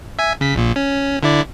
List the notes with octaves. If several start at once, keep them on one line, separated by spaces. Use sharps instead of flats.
E5 G#5
C#3 B6
A#1 A#2
C#4
D3 E4 D5